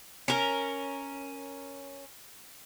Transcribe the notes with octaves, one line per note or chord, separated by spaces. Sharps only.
C#4 A#4